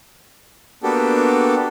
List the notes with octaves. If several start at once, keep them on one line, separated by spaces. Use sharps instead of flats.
A#3 B3 D4 F#4 G4 A4